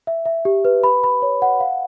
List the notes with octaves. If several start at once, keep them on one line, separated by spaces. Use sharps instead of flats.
E5
E5
G4
B4
B5
B5
C#5
F#5
F5